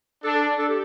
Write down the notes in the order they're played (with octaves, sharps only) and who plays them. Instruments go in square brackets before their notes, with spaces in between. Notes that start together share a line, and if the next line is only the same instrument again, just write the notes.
[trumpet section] D4 [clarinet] A4
[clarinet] A4
G4